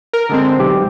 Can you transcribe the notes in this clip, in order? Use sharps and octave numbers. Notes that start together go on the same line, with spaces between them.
A#4
D3 G#3 C4
B1 G4